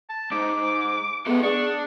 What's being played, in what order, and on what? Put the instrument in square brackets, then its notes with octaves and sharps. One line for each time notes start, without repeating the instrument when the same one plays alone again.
[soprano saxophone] A5
[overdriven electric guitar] G#2 [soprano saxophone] D6
[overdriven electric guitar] G#3 A4 [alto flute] B3
[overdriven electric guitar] D4 [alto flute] G#4 [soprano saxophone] C#6